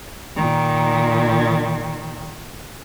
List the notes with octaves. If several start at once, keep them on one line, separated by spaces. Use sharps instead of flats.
A#2 D#3